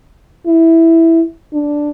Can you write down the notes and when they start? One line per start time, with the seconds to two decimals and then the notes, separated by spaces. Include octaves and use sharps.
0.47 E4
1.53 D4